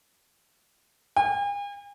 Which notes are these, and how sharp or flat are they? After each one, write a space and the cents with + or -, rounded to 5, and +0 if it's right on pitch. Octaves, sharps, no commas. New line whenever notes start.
G#5 -45